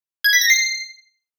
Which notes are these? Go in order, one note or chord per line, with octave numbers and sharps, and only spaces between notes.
G#6
B6
A#6
C7